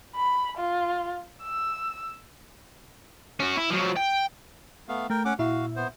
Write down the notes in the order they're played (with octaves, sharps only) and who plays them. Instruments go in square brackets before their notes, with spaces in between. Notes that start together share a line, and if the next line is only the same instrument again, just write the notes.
[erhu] B5
F4
E6
[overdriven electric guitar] C#4 F#4
E4
F3 F#3
G5
[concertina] A3 B3 F5
[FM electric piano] A3 [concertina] A#4 G5
[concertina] C#4 F#5 D6
[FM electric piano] A#2 E4 E5 [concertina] F#4 F5
[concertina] B3 C5